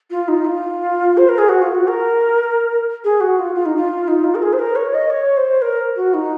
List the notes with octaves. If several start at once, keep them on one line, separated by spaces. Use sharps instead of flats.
F4
D#4
F4
C5
A#4
G#4
F#4
F4
F#4
A#4
G#4
F#4
F4
F4
D#4
F4
D#4
F4
A#4
G#4
C5
A#4
C#5
D#5
C#5
C5
A#4
F#4
D#4